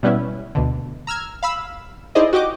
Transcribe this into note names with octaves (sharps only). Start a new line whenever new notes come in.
B2 G3 B3 C#4 E4
D2 B2 D3
A#5 E6 F6 G#6
F5 B5 E6
D#4 E4 G#4 C5 D5 D#5
F#4 G4 D#5 D6